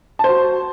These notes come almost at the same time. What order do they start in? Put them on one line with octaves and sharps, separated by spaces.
A5 C5 F#4